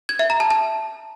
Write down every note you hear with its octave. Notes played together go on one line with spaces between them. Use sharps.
G#6
E5
A#5
A5
A5